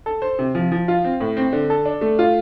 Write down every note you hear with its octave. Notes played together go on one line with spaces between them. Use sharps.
A4
C5
C3
F3
F3
F4
C4
A2
C4
D3
A4
D4
A3
F4